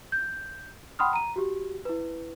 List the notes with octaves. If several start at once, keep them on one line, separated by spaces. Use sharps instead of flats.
G6
F#5 G5 B5 C6 D#6 F6
A#5 D#7
F#4 G4
E4 B4